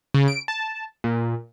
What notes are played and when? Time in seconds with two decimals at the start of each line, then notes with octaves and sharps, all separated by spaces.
0.14 C#3
0.28 D7
0.48 A5
1.04 A#2